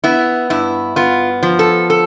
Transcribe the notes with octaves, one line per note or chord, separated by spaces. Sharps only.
B3 E4
G2 E4
B3 F4
F3
A4
A4